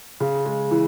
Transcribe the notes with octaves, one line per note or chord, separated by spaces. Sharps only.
C#3
G#3
E3